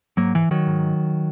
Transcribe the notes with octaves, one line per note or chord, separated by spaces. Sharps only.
G#2 F#3 A#3
E3
D#3 F#3
G#2